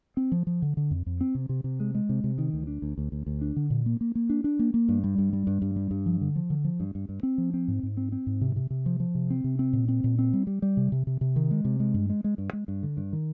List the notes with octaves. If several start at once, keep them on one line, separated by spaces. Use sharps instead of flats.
C4
F3
F3
D3
D3
F2
F2
C4
C3
C3
C3
G#3
G#3
C3
C3
D#3
D2
D4
D2
D2
D2
D2
D4
D3
A#2
A#3
A#3
A#3
D4
D4
A#3
A#3
G2
G3
G2
G3
G2
G2
G3
G2
F3
D3
F3
D3
F3
G2
G2
G2
C4
F3
C4
G#2
G#2
C4
C4
G#2
C3
C3
C3
F3
F3
C3
C4
C3
C4
A#2
C4
A#2
C4
G3
G3
G3
C3
C3
C3
C3
D#3
G#3
C3
G#3
G2
G#3
G#3
G2
G#3
G2
D3
G2
D#3